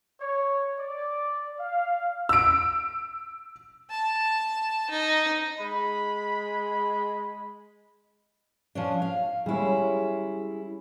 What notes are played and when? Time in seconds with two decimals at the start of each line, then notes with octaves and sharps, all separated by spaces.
0.21 C#5
0.79 D5
1.60 F5
2.29 E6 D7
3.91 A5
4.90 D#4
5.60 G#3 B5
8.75 F3 C#4 D4
9.02 F5
9.46 G3 G#3 C#4 E4 G#4